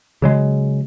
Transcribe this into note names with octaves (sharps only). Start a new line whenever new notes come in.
C#3 F#3 G#3